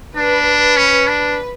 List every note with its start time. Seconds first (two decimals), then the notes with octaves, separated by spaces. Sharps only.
0.17 D4 B4
0.77 C#4
1.07 D4